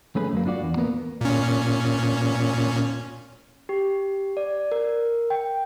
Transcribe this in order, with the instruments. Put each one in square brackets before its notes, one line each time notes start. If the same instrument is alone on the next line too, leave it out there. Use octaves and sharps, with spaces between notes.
[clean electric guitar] A3 C#4 G#4 B4
F#2 F#3 A#3
D4 F4 F#4 D5
E2
A#3 B3 A#4 B4
[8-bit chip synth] A#2 C#4
[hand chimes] G4
D5
A#4
G5